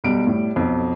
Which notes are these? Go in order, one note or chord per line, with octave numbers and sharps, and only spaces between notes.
B1 G3 D7
A2 G3
B1 F2